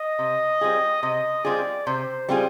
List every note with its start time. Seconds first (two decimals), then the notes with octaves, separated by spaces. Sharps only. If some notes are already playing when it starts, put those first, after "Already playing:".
Already playing: D#5
0.19 C3
0.61 G3 C4 F4 G#4
1.03 C3 D#5
1.45 G3 C4 F4 G#4 D5
1.87 C3 C5
2.29 G3 C4 F4 G#4